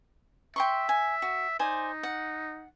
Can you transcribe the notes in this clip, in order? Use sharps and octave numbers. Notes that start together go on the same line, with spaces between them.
E5 G5 C6 C#6
G#5
F#4
D#4 C5 D5 G#5
F#5